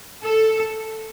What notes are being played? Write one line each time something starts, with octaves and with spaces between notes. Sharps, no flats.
A4